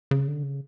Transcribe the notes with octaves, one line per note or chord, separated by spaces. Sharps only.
C#3
D3
C#3